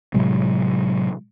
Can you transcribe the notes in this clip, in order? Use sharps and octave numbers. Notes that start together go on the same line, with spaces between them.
A2 C3 F#3 G#3